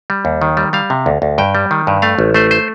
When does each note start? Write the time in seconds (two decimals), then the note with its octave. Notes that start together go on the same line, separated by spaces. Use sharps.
0.10 G3
0.25 D#2
0.42 D#3
0.57 G3
0.73 G3 F5
0.90 C3
1.06 D2
1.22 D2
1.38 G2 G5
1.55 G3
1.71 D#3
1.87 G2
2.02 A3 F5
2.19 A1
2.34 A3 C5
2.51 C5